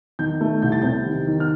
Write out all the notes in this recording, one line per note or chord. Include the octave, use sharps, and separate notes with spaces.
D#3 G6
A3
C2 G6
A6
C3 G6
D#3
D#3
F6